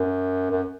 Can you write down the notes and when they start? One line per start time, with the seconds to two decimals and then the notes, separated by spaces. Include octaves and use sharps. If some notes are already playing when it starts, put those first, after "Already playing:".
Already playing: F#2
0.51 F#2